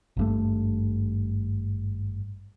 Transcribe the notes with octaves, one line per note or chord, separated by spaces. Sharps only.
G#1 G2 A3